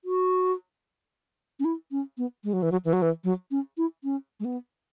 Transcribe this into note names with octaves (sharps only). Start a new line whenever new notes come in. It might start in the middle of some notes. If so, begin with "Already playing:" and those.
F#4
C#4
E4
C#4
B3
G#3
F#3
E3
F#3
E3
F#3
E3
F#3
C#4
E4
C#4
G#3
B3